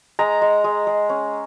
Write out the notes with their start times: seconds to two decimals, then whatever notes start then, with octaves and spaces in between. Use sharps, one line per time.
0.19 G#3 A#5
0.42 G#3
0.64 G#3
0.87 G#3
1.09 C#4